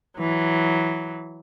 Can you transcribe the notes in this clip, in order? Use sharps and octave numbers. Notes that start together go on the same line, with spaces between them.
E3 F#3